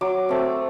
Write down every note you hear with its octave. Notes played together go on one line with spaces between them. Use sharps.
F#3 D6
A3 C4